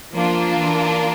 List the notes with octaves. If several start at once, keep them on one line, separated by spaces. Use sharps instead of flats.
F3 A#3 D4 F4
E3